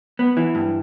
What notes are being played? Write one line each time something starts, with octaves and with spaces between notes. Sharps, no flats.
B3
E3
G2